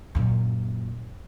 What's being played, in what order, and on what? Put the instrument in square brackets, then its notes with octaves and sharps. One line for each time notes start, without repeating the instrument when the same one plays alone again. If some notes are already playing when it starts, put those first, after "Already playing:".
[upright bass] F#2 A#2